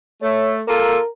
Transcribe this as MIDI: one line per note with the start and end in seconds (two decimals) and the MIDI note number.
0.22 0.61 57
0.22 0.53 73
0.68 0.98 58
0.68 0.98 65
0.68 0.98 69
0.68 1.08 70